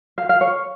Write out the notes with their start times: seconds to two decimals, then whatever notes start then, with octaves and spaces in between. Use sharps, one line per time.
0.18 F5
0.29 F5
0.41 C#5